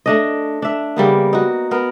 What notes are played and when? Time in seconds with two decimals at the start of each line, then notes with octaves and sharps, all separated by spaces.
0.06 A3 D4 D#5
0.62 D4 E5
0.97 C#3 G3 A#3 B3
1.33 D#4 F#4
1.71 B3 A#4